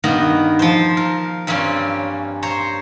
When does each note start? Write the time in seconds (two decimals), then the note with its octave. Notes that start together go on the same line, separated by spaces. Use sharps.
0.04 G2 D#3 A#3 B3 A#5
0.59 F3 C5
0.97 A#4
1.47 G2 G3 A#3 C4 C#4
2.42 C5 C#5 A#5 C6